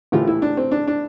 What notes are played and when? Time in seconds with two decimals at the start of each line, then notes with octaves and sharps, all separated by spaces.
0.12 A#1 A2 E3 G3 F4
0.27 E4
0.42 D4
0.57 C4
0.71 D4
0.88 D4